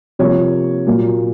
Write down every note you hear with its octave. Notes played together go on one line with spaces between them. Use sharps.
C3 F3 A#3 C#5
A#2 F#3 A#3